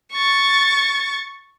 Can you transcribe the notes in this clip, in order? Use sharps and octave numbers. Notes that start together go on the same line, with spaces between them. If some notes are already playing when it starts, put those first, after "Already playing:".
C#6 A6